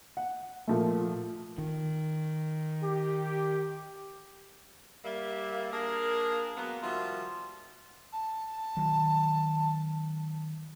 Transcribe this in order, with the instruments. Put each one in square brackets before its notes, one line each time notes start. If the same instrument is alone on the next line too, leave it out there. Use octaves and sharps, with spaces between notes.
[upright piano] F#5
A#2 F3 A3
[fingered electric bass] D#3
[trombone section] G4
[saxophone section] G3 A#3 E5
A#3 D4 G#4 A#4
F#3 G#3 A#3 B3
D#3 F3 G3 F4 F#4 E5
[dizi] A5
[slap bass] D#3 F#3